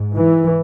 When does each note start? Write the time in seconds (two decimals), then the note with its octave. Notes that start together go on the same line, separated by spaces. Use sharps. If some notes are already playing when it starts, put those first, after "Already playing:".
Already playing: G#2
0.16 E3